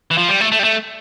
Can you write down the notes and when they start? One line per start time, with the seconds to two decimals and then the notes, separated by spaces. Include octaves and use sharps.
0.11 E3
0.18 F3
0.28 G3
0.41 A3
0.52 A3
0.59 G3
0.64 A3